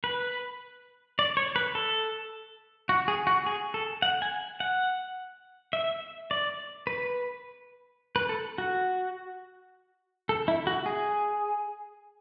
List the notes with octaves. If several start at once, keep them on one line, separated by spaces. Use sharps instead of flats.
B4
D5
C#5
B4
A4
F#4
G#4
F#4
G#4
A4
F#5
G#5
F#5
E5
D5
B4
B4
A4
F#4
A4
E4
F#4
G#4